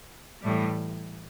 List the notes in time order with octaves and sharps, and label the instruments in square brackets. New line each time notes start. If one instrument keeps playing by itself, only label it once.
[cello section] A2 E3 G3